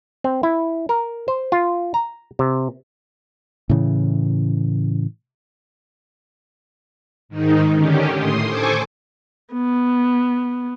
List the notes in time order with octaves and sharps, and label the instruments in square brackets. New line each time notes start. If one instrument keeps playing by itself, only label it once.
[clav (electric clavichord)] C4
E4
A#4
C5
F4
A#5
C3
[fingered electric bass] A2 C#3 E3
[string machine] G#2 D#3 D#4
D3 D#3 C#4 G4
A2 C6 D#6
A4 C5 G#5 C#6 D6
[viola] B3